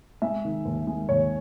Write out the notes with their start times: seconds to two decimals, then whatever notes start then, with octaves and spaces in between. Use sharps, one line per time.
0.22 G#3 E5
0.45 D#3
0.65 D#2
0.87 G#3
1.09 D#2 C#5